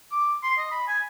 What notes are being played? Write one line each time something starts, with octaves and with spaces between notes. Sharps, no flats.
D6
C6
D#5
B5
G#5